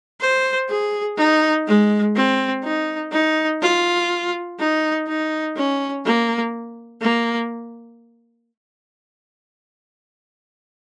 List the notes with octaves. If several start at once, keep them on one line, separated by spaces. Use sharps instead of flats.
C5
G#4
D#4
G#3
C4
D#4
D#4
F4
D#4
D#4
C#4
A#3
A#3